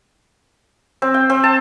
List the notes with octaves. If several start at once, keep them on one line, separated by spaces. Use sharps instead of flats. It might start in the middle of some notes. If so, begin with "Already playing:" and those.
C4
G5
C4
A5